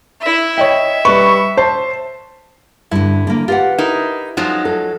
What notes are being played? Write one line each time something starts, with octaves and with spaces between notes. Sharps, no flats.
E4 E5
C#5 D#5 E5 G5
G3 B4 C#6
C5 A5
G2 D3 E4
D3 A#3
F4 G4 B4 F#5
D#4 E4 A#4
F3 F#3 G#3 D#4
A4